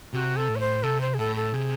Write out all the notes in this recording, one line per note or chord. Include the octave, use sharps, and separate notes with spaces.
C3 F#4
A4
A2
C#5
C5
C3 A4
C5
G#4
A2 A4
A4
C3 G#4